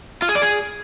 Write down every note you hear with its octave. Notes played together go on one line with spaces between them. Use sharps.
F4
G#4
D5
G#4